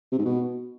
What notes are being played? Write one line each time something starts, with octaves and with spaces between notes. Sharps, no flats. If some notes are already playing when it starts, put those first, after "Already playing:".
C3
G#2
B2